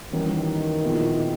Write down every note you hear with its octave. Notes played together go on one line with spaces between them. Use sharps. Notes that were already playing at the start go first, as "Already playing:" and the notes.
D#3 E3 G3 A#3 C#4 F#4
A#2 F3 G#3 B3 E4